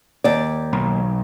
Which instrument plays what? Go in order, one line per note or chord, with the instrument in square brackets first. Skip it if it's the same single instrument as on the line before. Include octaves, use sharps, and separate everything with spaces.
[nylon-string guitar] D#2 D5
[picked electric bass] B1